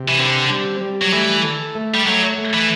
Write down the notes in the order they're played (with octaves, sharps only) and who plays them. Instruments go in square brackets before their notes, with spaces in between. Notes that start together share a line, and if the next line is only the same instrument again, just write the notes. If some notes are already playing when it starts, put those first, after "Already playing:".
Already playing: [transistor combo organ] C3
[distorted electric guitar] E3
[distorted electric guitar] D3 [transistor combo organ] C4
[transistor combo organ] G3
G3
[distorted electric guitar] F#3
[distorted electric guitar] E3 [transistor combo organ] A3
[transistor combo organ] A4
A3
[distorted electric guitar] G3
[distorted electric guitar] F#3 [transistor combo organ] A3
[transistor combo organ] A3
[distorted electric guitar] E3